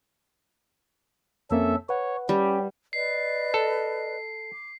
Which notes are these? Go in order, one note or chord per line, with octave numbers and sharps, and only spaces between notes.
F2 A#3 C4 C#4 A4 E5
B4 C#5 F#5
G3 C#4 G4
B4 D5 D#5 C7
A4
D6